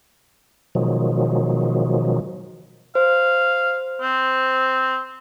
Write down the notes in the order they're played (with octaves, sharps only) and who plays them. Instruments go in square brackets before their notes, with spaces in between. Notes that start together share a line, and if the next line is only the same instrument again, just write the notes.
[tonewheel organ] B2 D#3 F3 F#3 G#3
[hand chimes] C5 [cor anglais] F5
[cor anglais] C4